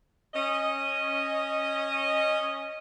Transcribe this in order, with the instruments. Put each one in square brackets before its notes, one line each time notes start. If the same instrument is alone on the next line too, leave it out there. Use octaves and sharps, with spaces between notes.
[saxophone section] C#4 D#5